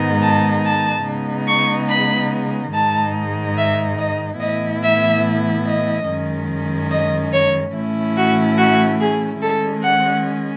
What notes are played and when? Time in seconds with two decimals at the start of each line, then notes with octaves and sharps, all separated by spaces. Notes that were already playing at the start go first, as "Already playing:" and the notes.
Already playing: G#2 D#3 G#3 B3 D#4
0.22 A5
0.65 A5
1.06 C#3 G#3 B3 D#4
1.48 C#6
1.90 B5
2.73 G#2 D#3 G#3 D#4 A5
3.57 E5
3.99 D#5
4.41 A2 E3 B3 E4 D#5
4.82 E5
5.66 D#5
6.08 F#2 D#3 G#3 C#4
6.91 D#5
7.33 C#5
7.75 A2 E3 A3 C#4 E4
8.17 F#4
8.58 F#4
9.00 G#4
9.42 D#3 G#3 C#4 A4
9.84 F#5